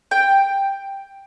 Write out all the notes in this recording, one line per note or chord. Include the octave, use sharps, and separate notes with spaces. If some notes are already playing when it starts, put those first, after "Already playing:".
G5